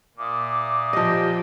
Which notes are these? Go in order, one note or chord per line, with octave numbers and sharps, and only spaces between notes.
A#2 E5 D6 D#6
F3 G4 D#5